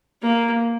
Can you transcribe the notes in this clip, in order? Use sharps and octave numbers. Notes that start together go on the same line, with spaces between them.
A#3